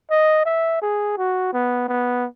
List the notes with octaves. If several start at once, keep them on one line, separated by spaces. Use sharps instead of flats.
D#5
E5
G#4
F#4
B3
B3